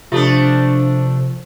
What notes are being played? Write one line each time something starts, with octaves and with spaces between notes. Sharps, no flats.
C3 F3 A3 D4 F4 G4 D#6